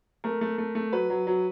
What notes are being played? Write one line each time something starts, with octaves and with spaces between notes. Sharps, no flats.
A3 A#4
A3
A3
A3
F#3 B4
F#3
F#3